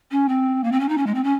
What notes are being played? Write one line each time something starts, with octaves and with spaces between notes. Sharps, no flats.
C#4
C4
A#3
C4
C#4
D#4
C#4
G#3
C4
C#4